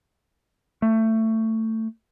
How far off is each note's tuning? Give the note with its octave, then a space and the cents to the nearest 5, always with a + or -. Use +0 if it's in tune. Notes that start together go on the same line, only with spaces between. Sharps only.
A3 +20